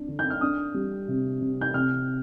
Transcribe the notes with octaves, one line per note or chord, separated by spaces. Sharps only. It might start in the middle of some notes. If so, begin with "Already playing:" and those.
Already playing: D4
D3
G6
F6
D4 D#6
G3
C3
C3
G6
C3 F6